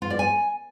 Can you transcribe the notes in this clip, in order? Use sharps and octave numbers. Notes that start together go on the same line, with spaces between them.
F4
D5
G#5